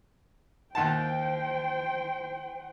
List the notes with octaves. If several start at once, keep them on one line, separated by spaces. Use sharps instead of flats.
D#2 C5 F#5 G5 A5